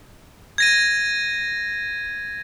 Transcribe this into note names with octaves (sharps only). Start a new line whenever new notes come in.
G#6 A#6 D#7